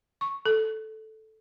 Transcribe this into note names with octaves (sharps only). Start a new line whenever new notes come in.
C#6
A4